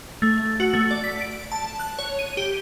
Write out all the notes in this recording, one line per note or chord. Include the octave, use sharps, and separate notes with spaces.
A3
F#4
A3
D5
B6
D7
A5
F#6
C#5
D#7
G4